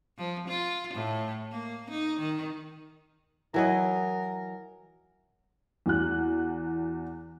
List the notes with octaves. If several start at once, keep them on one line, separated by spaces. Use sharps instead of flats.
F3
F4
A2
A#3
D#4
D#3
E3 F#3 A#4 D#5
E2 F#4 F#6